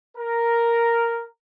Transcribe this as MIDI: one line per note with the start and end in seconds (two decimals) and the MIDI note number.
0.17 1.26 70